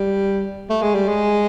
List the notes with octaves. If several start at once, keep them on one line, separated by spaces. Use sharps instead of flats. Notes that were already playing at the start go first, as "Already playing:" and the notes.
Already playing: G3
A3
G#3
G3
G#3